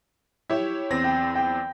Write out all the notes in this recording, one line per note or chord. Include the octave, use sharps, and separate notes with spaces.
E4 G4 C#5 E5
E2 C4 A#6
G5
G5